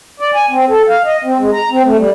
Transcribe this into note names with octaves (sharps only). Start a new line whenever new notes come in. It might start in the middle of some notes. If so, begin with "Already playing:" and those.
D5
G#5
C4
A4
F5
D#5
C4
G#3
A#5
C4
A3
G3